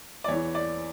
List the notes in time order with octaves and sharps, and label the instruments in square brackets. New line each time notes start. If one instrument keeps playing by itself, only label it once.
[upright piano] D5
E2 E3 C#5
D5